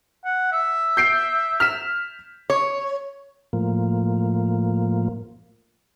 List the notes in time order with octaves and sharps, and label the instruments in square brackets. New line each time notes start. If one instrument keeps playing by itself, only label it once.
[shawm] F#5
E5
[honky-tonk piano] G6 C7 D7
F6 B6 E7
[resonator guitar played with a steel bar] C#5
[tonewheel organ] A2 F3 A#3